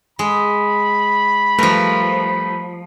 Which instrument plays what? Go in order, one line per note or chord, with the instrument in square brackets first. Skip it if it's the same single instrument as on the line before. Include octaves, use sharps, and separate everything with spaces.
[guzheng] G#3 [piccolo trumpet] B5
[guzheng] F3 A#4 [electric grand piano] G3 A3 B4